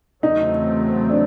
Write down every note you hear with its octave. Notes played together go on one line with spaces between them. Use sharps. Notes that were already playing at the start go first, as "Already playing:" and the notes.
E2 C#3 F#3 A3 C4 D#4
D4